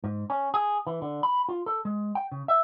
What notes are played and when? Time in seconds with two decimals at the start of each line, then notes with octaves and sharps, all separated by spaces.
0.04 G#2
0.30 C#4
0.54 G#4
0.87 E3
1.02 D3
1.23 B5
1.49 F4
1.66 A4
1.85 G#3
2.15 G5
2.32 C#3
2.48 E5